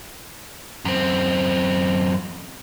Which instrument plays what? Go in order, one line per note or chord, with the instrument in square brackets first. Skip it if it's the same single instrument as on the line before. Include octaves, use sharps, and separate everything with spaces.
[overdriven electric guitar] F#2 C4